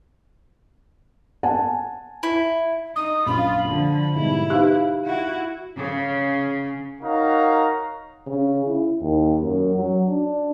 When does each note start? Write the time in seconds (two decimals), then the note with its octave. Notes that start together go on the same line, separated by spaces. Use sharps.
1.43 F#5 G#5 A5
2.23 E4
2.96 D#4 D#6
3.27 A#1 F#2 F4 B5
3.68 D3 F3 D4
4.15 G#2 B2 G3 E4
4.50 D#4 G4 B4 F5 F#6
5.05 E4 F#4
5.78 C#3
7.01 D#4 F#4 A#4 C#5 F5 A#5
8.27 C#3
8.66 E4
9.01 D#2
9.43 F#2
9.75 F#3
10.08 D4